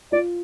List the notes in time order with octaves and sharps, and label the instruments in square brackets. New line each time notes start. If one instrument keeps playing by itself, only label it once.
[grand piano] F4 [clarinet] D5